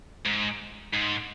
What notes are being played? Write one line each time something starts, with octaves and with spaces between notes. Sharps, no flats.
G#2
G#2